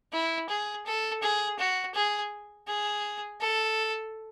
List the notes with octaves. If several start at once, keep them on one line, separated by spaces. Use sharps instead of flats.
E4
G#4
A4
G#4
F#4
G#4
G#4
A4